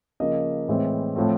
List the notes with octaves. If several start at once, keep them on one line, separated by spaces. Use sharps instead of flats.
C#3 F3 A#3 D#5
A2 E3 G#3 C4
A2 F3 A3 C4